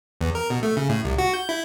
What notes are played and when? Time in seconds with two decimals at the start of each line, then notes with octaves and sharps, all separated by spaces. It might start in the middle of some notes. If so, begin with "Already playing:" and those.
0.21 E2
0.35 A#4
0.50 B2
0.63 A3
0.77 C#3
0.89 A2
1.05 C2
1.18 F#4
1.34 G6
1.49 E4